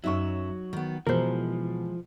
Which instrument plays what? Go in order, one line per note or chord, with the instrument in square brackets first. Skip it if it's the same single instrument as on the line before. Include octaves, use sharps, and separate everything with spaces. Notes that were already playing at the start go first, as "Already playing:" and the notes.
[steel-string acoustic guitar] F#2 B2 E5 [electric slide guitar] F#3 [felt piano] D#4 C#6
[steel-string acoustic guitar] D#3 B3
[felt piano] B2 [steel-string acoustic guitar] E3 G#3 [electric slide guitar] F3 [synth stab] A#4 C5